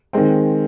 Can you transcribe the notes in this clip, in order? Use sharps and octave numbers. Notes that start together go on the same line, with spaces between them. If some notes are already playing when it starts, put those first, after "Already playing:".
D#3 G#3 C4